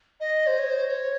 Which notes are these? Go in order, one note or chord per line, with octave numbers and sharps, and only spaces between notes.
D#5
C5
C#5
C5
C#5